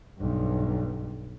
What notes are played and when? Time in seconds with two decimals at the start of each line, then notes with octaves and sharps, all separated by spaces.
0.18 B1 G2